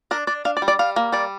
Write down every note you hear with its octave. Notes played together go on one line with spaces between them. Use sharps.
D4 A#4
D4 D5
D4 F5
D5
G3
D5
G3 F5
A#3
G3 D5